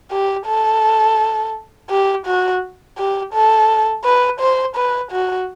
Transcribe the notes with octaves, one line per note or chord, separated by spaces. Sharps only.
G4
A4
G4
F#4
G4
A4
B4
C5
B4
F#4